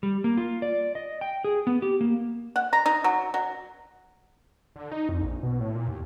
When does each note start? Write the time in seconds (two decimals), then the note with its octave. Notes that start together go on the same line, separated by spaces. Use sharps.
0.03 G3
0.24 A#3
0.37 F4
0.62 D5
0.95 D#5
1.21 G5
1.44 G#4
1.67 B3
1.82 G4
2.01 A#3
2.56 F#5
2.73 A#5
2.86 D#4
3.04 F#3
3.34 F#3
4.76 D3
4.91 D#4
5.09 F2
5.22 A#1
5.43 B2
5.60 A2
5.75 A#2
5.88 D#2